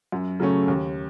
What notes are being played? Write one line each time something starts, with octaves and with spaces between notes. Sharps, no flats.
F#2
C#3 F#3 A3 C#4
D#2